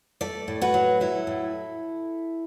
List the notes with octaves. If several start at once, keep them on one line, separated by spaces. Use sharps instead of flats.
A3 A4 D5
A2
F#4 B4
F#3
F#3 E4 A4
A2